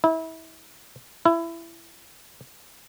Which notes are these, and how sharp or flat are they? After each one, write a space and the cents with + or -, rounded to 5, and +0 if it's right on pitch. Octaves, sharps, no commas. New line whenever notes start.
E4 -30
E4 +20